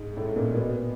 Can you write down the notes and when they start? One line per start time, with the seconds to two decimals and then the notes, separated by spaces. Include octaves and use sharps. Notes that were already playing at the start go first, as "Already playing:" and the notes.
Already playing: G#2 G#3
0.17 A2 A3
0.36 A#2 A#3
0.55 B2 B3